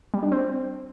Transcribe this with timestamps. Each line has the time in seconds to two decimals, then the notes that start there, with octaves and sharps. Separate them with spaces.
0.14 G3
0.23 D4
0.32 C4